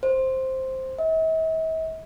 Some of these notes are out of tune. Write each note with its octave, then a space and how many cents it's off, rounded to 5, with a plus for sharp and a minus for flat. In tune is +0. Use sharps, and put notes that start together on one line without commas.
C5 +5
E5 -45